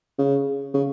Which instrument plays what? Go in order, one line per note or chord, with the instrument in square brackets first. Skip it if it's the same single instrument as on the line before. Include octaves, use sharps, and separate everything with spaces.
[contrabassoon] C#3
C#3